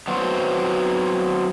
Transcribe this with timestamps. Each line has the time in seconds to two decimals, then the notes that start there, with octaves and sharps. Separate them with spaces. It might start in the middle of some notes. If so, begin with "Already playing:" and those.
0.07 F#3 B3 C4 F#4 C5